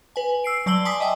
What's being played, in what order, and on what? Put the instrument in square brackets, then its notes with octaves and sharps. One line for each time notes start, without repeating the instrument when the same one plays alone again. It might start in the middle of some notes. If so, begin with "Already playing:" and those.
[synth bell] B4 G#5
E6 C7 D7
F#3 D5 A5 E6 F#7 G7
G#5 A5 C6 D6 D#6 B6
D#5 E5 G5 G#5